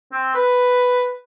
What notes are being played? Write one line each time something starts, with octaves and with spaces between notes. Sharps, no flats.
C4
B4